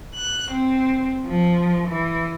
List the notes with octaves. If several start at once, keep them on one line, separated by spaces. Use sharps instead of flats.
F#6
C4
F3
E3